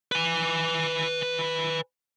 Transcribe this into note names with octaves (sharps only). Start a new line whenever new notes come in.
B4 G#5